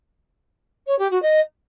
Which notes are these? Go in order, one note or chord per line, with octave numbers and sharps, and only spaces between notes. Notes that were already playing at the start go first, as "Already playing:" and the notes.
C#5
G4
F#4
D#5